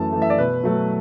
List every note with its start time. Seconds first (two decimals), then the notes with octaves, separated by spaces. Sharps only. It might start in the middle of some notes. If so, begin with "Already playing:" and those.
Already playing: F#2 E3 A3 A5
0.13 E3 A3
0.22 E5
0.30 D5
0.38 B2 B4
0.63 F#3 A3